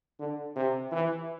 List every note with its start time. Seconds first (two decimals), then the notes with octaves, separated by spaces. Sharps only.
0.19 D3
0.56 C3
0.92 E3